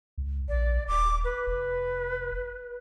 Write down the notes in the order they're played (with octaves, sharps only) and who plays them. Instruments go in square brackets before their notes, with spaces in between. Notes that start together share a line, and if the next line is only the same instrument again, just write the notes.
[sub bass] C#2
[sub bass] A#1 [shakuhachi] D5
[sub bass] D#1 [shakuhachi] D6
[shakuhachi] B4
[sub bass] F1